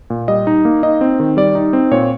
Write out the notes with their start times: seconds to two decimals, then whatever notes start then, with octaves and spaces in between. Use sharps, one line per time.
0.10 A#2
0.28 G3 D#5
0.47 D#4
0.65 A#3
0.83 D#4 D#5
1.01 C4
1.20 D#3
1.37 G3 D5
1.55 D#4
1.73 C4
1.91 A#2 C#5